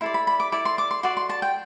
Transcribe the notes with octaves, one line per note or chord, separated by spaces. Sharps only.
E4 A4 D5 C6
B5
B5
D6
E4 A4 D5 D6
C6
D6
C6
F#4 A4 D5 C6
C6
A5
G5